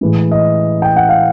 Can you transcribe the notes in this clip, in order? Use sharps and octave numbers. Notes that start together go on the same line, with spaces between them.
A2 E3 G#3
D#5
G5
F#5
F5